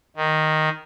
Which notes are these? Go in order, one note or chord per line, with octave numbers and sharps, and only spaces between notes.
D#3